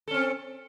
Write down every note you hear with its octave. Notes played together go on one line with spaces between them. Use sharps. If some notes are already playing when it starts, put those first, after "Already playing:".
C4 C#4 A4